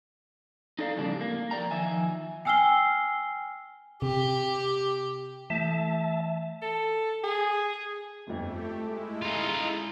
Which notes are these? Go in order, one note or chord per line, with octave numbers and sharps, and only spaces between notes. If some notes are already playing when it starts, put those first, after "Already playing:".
D#4 A4 D5 F5 A#5
F2 A2 C#3 G3 D4
A#3
F3 G3 D5 G5 A#5
D#3 F3 E5 G#5
G5 G#5 E6 F6 C7 G7
C3 G4
E3 A3 E5 A5
A4
G#4
G1 F2 A3 G4
G#3 A3 E4
D#4 F4